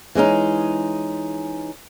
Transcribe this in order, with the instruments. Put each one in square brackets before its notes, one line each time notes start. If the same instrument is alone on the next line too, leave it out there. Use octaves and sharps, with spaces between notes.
[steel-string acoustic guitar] E3 G#3 C#4 D#4